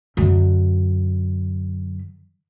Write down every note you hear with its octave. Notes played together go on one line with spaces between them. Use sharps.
F#2 D3